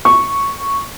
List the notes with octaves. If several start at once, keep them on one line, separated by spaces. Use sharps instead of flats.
C#6